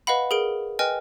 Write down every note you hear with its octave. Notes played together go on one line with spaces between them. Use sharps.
B4 D#5 F5 F#5 B5
G#4 A#4 D7
B4 D#5 G5 G#5 F6